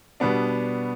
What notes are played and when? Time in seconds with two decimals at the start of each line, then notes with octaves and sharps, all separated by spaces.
0.20 B2 G3 B3 D4